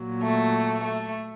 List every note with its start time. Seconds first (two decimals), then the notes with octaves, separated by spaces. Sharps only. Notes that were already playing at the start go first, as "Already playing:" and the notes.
Already playing: A#2 F#3
0.21 A3
0.84 A3